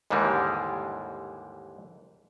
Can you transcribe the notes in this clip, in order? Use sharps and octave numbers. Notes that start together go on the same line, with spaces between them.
D#2 G#2 D3 E3 G3 G#3